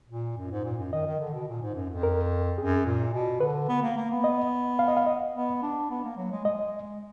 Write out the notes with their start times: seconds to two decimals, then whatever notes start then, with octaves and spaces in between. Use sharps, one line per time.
0.09 A#2
0.37 F#2
0.51 G#2
0.65 A#2
0.78 F#2
0.93 D#3 D#5
1.06 D#3
1.20 D3
1.34 B2
1.47 A#2
1.62 G#2
1.75 F#2
1.90 F2
2.03 A#4
2.58 F#2 G#4
2.86 A#2
3.14 B2
3.40 D3 B4
3.68 B3
3.82 A#3
3.97 A#3
4.10 B3
4.24 D#5
4.79 F5
4.88 D#5
4.97 F5
5.06 D#5
5.34 B3
5.62 D4
5.90 B3
6.04 A#3
6.17 F#3
6.31 G#3
6.45 G#3 D#5